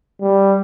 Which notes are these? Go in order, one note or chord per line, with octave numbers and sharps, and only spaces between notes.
G3